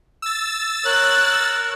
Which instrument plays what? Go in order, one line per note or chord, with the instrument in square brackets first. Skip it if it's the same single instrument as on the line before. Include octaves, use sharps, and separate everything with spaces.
[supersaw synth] E6 A6
[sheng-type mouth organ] A#4 C#5 [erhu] F#6